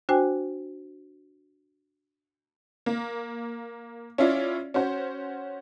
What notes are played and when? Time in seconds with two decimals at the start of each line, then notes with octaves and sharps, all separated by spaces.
0.09 D4 F#4 C5 G5 G#5
2.86 A#3
4.18 C#4 E4 F4 D5
4.74 C#4 F#4 C5